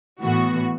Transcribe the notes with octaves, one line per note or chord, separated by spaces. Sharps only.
A2 E3 B3 F#4